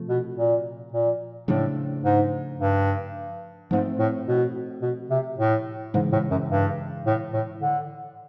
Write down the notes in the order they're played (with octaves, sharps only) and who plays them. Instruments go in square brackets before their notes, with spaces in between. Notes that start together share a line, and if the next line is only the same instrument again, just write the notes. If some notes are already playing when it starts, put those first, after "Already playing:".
Already playing: [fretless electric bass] C3 F3 A3
[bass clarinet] B2
A#2
A#2
[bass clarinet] A2 [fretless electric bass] C#3 F3 A3 D4
[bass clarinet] G#2
G2
[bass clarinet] G#2 [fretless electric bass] F3 A3 C4
[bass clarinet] A2
B2
B2
C3
A2
[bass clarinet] G#2 [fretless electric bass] C#3 E3 G#3
[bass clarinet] A2
F#2
G2
A2
A2
D3